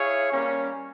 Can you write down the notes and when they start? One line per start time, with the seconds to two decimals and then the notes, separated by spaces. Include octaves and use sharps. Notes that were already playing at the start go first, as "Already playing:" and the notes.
Already playing: E4 G#4 C#5 F5
0.32 G3 A#3 C#4